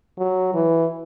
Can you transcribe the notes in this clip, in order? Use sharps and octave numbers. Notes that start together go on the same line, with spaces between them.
F#3
E3